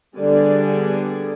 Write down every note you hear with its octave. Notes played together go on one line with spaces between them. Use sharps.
D3 G3 B3 G#4 D5